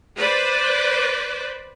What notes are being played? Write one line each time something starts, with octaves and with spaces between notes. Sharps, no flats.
B4 C5 D5